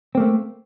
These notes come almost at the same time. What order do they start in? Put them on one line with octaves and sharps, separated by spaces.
C4 A#3 A3